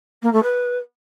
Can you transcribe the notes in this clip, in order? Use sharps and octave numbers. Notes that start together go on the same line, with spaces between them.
A#3
A3
B4